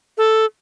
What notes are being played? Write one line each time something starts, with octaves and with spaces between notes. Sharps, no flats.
A4